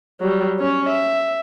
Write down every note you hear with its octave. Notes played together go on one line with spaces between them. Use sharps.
F#3 G3
C#4 C#5
E5